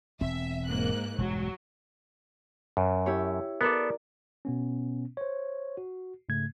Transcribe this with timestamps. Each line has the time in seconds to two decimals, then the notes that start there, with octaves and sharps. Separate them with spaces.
0.21 E1 C4 E5
0.69 G#2 A#3 F#6
1.18 E1 G2 F#3 G#3
2.77 F#2
3.06 E4 G4 C#5
3.61 B3 A4 A#4 D5 D6
4.45 B2 B3 C#4
5.17 C5 C#5
5.77 F#4
6.29 G#2 C#3 A3 G#6